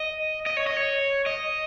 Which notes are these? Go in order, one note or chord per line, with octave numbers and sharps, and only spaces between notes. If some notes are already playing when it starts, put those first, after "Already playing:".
Already playing: D#5
D#5
C#5
D#5
C#5
D#5